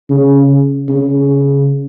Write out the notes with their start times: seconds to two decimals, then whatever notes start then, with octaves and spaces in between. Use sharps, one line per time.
0.10 C#3
0.89 C#3